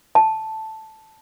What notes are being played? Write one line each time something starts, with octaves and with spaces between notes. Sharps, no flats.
A5